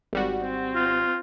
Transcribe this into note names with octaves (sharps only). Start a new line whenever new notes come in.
G#1 G3 F#4
C4
F4